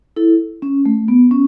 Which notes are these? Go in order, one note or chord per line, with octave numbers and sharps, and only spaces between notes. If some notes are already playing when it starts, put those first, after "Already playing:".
E4 A4
C#4
A3
B3
C#4